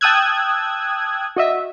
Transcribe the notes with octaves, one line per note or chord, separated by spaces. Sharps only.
G5 A5 D#6 E6 F#6 G#6
F#4 D#5 E5